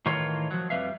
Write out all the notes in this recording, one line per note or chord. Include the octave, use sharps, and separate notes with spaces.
A2 D#3 E3 F4 A#4 C#5
F3 F#3
F2 G3 A3 B4 E5 F5